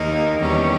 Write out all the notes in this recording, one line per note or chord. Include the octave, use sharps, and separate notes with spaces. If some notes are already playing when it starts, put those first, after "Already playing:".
Already playing: D#2 D#3 A#3 D#4
E2 D#3 G3 C#4